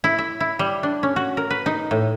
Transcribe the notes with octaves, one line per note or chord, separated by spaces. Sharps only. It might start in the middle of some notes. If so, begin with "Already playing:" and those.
E4
E5
E4
G3
D4
C#4
F#4
A#4
B4
D#4
A2